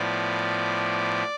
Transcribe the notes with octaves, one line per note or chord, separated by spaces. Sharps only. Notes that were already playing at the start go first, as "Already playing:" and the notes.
Already playing: A2 F3 B3 D5